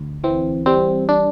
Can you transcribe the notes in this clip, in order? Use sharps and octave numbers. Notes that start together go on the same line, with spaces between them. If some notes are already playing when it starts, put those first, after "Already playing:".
Already playing: D2
E3 C4
G3 C4
D4